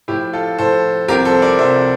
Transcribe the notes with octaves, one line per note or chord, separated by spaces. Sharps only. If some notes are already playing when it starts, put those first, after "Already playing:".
A2 F3 E4 G4
F4 A4
A2 F3 A4 C5
C2 C3 F3 G4 A#4
A4 C5
A#4 D5
C2 C3 F3 C5 E5